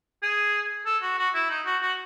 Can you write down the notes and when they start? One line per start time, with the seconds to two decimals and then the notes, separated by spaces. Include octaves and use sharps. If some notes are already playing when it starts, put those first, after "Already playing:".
0.23 G#4
0.86 A4
1.02 F#4
1.18 F#4
1.34 E4
1.50 D#4
1.66 F#4
1.82 F#4